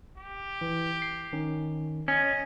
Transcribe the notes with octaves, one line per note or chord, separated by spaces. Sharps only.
G4
E3
C7
D#3 C#4
C#4 D#5